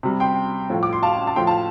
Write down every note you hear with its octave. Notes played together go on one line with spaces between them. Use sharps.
C3 G3
G5 C6
A2 F3
D6
C6
F5 A5
A5
A2 F3 G5 C6
F5 A5